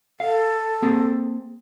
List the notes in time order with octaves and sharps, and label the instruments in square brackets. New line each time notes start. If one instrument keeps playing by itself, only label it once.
[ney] A4 [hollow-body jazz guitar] F5
[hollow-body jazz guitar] A#3 C4 G#4